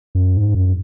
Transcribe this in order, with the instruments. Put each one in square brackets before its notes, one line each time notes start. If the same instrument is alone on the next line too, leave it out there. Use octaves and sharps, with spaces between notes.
[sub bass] F#2
G#2
F#2